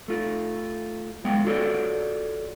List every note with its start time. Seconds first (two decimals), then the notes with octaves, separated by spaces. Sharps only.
0.08 A3 F4
1.24 F#2 G#3 B3 F5 G5
1.45 F4 F#4 G#4 A4 C#5 D5